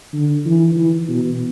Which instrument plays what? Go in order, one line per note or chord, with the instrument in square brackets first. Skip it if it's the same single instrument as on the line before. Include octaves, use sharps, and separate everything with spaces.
[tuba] D3
E3
E3
B2